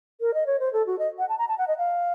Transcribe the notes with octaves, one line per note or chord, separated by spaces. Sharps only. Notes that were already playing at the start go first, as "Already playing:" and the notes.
A#4
D#5
C#5
C5
A4
F#4
D#5
F#5
A5
A#5
A5
F#5
D#5
F5